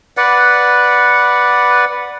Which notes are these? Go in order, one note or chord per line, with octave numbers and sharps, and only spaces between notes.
B4 D5 F#5